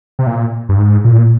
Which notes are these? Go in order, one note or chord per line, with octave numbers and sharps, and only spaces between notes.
C3
A#2
G2
G#2
A#2